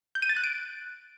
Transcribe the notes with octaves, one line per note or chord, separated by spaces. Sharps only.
G6
D#7
A6
F#6
D7